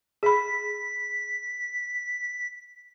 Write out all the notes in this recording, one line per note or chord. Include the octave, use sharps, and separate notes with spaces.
G#4 B5 B6